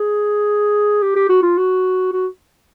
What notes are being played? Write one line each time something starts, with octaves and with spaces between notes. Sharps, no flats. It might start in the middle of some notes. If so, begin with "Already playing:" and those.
Already playing: G#4
G4
G4
F#4
F4
F#4
F#4